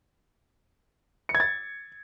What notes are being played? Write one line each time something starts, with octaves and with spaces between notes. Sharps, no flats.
C#7
G#6
A6